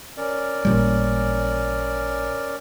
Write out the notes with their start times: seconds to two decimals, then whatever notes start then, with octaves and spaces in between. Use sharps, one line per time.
0.18 C#4 A#4 D5
0.65 A1 A#2 G3